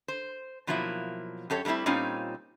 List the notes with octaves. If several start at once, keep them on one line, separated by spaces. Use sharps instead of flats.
C5
B2 F3 F#3 A#3 E4
F#2 G4 A4 C#5
D3 G3 A3 C4 E4
A#2 G3 C4 C#4 D#4 F4